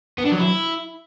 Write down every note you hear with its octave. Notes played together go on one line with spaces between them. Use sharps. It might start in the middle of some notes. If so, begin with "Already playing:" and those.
B3
D4
F#3
E4